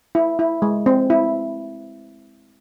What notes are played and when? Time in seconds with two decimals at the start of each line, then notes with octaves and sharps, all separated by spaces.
0.15 E4
0.39 E4
0.62 G#3
0.86 C4
1.10 E4